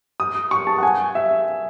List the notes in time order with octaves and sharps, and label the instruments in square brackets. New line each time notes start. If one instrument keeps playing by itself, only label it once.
[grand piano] D#6
C#6
A5
F#5
G#5
E5